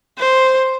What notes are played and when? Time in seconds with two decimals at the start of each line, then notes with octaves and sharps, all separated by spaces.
0.19 C5